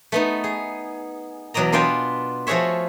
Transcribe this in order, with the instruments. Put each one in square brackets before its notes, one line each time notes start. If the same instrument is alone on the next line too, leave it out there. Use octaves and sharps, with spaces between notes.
[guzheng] A3 B3 D#4
G#4
E2 B2 F#3 D5 D#5 A#5
B3 D4 F4 F5 G5 G#5
F3 A3 F#4 G#4 C#5 E5